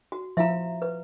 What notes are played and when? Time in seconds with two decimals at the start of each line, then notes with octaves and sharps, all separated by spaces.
0.12 F#4
0.37 F3 E4 E5 F5 A#5
0.82 B4